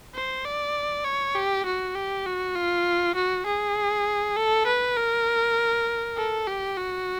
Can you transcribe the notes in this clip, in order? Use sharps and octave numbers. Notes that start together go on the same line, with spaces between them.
C5
D5
C#5
G4
F#4
G4
F#4
F4
F#4
G#4
A4
B4
A#4
A4
G4
F#4